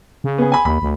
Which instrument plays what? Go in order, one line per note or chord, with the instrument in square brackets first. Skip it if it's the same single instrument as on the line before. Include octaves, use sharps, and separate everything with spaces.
[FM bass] C#3
[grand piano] B3 G#4
G#5 B5
[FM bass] D#2 [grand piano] B5
[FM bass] D2